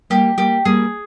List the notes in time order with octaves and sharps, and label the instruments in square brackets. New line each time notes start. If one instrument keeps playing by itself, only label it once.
[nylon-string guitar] G3 A#3 [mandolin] G4
[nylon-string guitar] G3 A#3 [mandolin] G4
[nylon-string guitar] G3 A#3 [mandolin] G#4